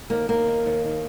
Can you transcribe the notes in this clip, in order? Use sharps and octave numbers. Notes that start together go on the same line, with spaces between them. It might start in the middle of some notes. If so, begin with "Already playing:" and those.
D#2 A#3
D#2 A#3
D#3
D#2
D#3